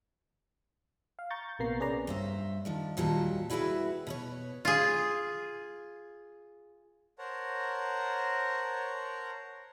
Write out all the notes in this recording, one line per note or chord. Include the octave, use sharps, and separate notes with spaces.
F5
A#5 C#6 G6 A6
A#1 C3 A#3 B3 A#5 C7
C#4 G#4 B4 C#5 D5 A#5
G2 C5 E5
D#3 F3 D4
D#2 A#2 F#3 G3 A5
G3 E4 F#4 G#4 B4 E5
B2 B4 C#5
F4 G#4
A#4 C5 C#5 F#5 A5 A#5